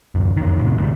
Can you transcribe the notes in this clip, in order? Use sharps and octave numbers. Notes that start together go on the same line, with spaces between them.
D1 F#2
F2 D#3
A2 C3
D2 G2 F3 G3